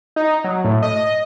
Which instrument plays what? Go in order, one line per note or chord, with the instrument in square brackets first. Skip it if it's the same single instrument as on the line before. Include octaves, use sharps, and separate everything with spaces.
[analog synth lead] D#4
F#3
A2
D#5